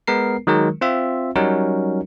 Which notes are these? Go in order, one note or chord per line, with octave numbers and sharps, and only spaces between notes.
G#3 B3 A#4 C7
D#3 F#3 G#3 A#4
C4 F4 E5
F#3 G3 C#4 D#4 F#4 A#4